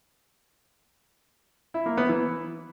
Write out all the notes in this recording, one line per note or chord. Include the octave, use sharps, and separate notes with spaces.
E4
A#3
B3
E3